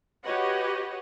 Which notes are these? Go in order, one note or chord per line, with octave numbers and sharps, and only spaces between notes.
F#4 G4 B4 C#5 D#5 F#5